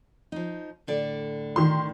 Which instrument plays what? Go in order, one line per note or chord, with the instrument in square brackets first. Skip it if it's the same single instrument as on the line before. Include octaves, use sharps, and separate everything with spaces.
[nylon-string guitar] F3 D#4
A2 D3 D5
[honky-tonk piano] D#3 C6